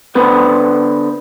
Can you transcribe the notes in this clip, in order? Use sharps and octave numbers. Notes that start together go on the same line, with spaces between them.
D3 B3 B4 C5